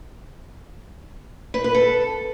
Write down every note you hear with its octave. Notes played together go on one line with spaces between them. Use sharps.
B4
B4
A4